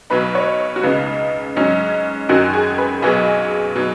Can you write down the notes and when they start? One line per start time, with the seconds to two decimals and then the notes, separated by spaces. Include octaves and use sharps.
0.10 B1 B2 F#3 D#4 B4
0.35 C#5
0.76 F#4
0.83 C#2 C#3 B3 D#4
1.56 G#2 F#3 C#4 D#4
2.29 F#2 D#3 F#3 F#4
2.53 G#4
2.78 B4
3.02 B1 B2 F#3 B3 G#4
3.75 B2 F#3 D#4